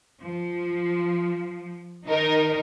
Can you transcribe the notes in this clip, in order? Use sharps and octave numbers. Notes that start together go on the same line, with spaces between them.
F3
D#3 D#4 A#4